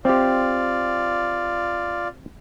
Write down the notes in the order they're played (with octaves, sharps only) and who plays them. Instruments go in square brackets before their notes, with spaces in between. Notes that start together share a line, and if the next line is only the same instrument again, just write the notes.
[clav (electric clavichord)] C4 G4 [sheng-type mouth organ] F4 D5